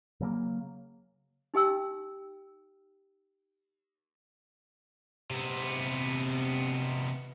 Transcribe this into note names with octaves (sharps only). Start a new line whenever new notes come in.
C#3 F#3 A3 A#3
D#4 G4 G5 E6
C3 B3